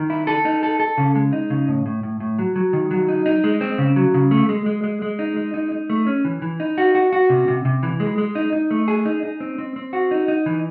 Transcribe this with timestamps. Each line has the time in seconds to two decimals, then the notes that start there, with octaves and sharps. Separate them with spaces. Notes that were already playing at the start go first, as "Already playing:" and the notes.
Already playing: D#3
0.10 E4
0.27 A4
0.45 D#4
0.63 A4
0.80 A4
0.98 C#3
1.15 G#3
1.33 D#4
1.50 C#3
1.68 A2
1.86 A2
2.03 A2
2.20 A2
2.39 F#3
2.56 F#3
2.73 D#3
2.91 F#3
3.08 D#4
3.26 D#4
3.44 G#3
3.61 C4
3.78 C#3
3.96 F#3
4.14 C#3
4.31 A3
4.49 G#3
4.66 G#3
4.84 G#3
5.02 G#3
5.19 D#4
5.36 G#3
5.54 D#4
5.72 D#4
5.90 A3
6.07 C#4
6.25 E3
6.42 E3
6.60 D#4
6.78 F#4
6.95 F#4
7.13 F#4
7.30 C3
7.48 C3
7.65 C3
7.83 E3
8.00 G#3
8.18 G#3
8.35 D#4
8.53 D#4
8.71 A3
8.88 G#4
9.05 D#4
9.23 D#4
9.40 C4
9.58 C4
9.76 C4
9.93 F#4
10.11 D#4
10.28 D#4
10.46 E3